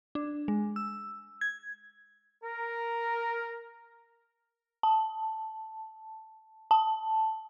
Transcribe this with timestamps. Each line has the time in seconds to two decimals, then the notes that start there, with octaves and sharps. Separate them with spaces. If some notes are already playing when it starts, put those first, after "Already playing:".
0.15 D4
0.48 G#3
0.76 E6
1.41 G#6
2.43 A#4
4.83 A5
6.71 A5